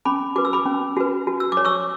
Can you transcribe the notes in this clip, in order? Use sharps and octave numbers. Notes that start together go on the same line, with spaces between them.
C#4 B5 D6
F#4 B4 D6
E6
B5 D6
C#4
F#4 B4
F#4
E6
D6
C#5
C#6 E6